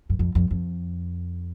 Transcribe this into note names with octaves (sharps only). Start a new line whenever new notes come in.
F#2
F2
F2
F2